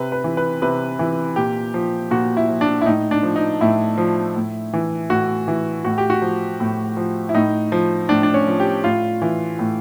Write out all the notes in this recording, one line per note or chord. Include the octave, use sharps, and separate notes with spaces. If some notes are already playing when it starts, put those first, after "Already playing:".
Already playing: C3 B4
B4
E3
B4
C3 B4
E3
A#2 G4
F3
A#2 F#4
E4
F3
D4
E4
A2 D#4
D4
F3
D#4
A2 E4
F3
A2
E3
A2 F#4
E3
A2 F#4
G4
F#4
F3
A2
F3
E4
A2 D#4
F3
A2 D4
D4
C#4
F3
G4
A2 F4
E3
A2